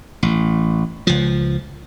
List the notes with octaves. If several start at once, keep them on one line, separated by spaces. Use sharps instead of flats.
A1
C#2 F3